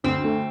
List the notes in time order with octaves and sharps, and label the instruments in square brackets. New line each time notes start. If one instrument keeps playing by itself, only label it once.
[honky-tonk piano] D2 [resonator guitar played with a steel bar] C4
[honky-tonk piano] A3